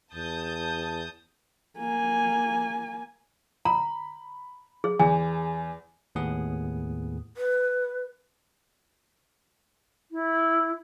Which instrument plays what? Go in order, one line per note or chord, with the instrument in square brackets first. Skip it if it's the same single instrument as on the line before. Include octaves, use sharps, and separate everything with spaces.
[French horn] E2 [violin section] A5 D#6 G6
[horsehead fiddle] A#3 G#5
[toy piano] A#5 [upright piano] B5
[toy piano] G#4
[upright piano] E2 [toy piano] G#5
[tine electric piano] D#2 A2 B3 G#4 F#5 D#6
[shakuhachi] B4
[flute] E4